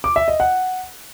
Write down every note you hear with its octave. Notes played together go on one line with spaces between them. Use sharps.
D6
E5
D#5
F#5